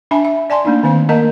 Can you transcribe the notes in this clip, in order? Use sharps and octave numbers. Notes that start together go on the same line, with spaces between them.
D4 E5 G#5 A5 B5
E5
D5 G#5 A5 C6
A3 A#3 D4 D#4
D#3 C4 C5 F5
A3 A#3 A#4 D#5 A5 A#5